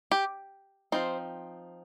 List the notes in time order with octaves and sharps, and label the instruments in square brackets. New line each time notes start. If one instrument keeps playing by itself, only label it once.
[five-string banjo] G4
F3 C4 D#4 C5